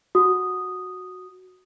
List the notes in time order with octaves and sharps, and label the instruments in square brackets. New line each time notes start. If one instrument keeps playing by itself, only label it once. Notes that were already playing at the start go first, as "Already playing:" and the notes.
[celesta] F#4 D#6